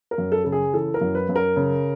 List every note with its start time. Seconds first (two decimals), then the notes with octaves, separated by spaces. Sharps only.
0.11 A#4
0.18 F#2
0.32 A4
0.45 C#3 A4
0.52 G#4
0.74 E3 A4
0.94 A#4
1.01 F#2
1.15 B4
1.29 F#2
1.36 A#4
1.56 C#3